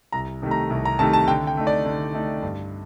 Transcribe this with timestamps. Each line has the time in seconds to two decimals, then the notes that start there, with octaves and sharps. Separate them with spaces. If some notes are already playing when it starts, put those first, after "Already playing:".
0.12 C2 A#5
0.42 C3 D#3 A3
0.51 A#5
0.70 C2
0.85 A#5
0.99 C3 D#3 A3 A5
1.13 A5
1.27 D3 G5
1.47 G5
1.57 A3 D#4
1.67 D5
1.86 D3
2.14 A3 D#4
2.42 G2